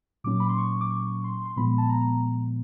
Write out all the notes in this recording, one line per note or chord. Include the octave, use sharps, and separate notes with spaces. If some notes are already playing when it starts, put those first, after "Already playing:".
A#2 F#3 A#3 C#4 D6
B5
C6
C#6
D6
C#6
C6
C6
A#2 F3 G#3 B3 B5
A5
A#5